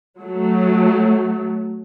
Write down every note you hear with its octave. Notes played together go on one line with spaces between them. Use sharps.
F#3 A3